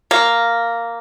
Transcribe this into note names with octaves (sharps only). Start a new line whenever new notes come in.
A#3